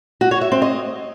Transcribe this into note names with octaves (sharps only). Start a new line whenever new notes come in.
F#4
C#5
E5
C4
D#5